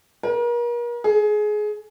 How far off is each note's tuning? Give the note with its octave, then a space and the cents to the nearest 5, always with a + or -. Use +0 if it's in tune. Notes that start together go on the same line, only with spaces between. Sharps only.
A#4 +40
G#4 +20